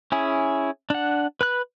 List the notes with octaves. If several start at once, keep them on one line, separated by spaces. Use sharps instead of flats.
C#4 E4 G#4
D4 F#5
B4 B5 F#6